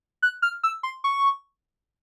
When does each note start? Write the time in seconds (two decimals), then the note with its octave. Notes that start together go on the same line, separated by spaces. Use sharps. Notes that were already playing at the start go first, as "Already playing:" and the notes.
0.22 F#6
0.42 F6
0.63 E6
0.83 C6
1.04 C#6